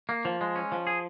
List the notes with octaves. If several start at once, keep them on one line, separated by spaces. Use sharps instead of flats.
A#3
F3
G#3
C#4
F3
G#4